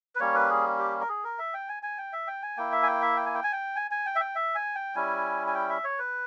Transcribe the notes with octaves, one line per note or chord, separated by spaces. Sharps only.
B4
G3 A#3 C#4 C#5
B4
G#4
G4
A#4
G#4
A#4
E5
G5
G#5
G#5
G5
E5
G5
G#5
A#3 E4 G5
E5
G#5
G5
E5
G5
G#5
G5
G#5
G5
G#5
G#5
G5
E5
G5
E5
G#5
G5
G3 C#4 E4 G#5
G#5
G5
E5
C#5
B4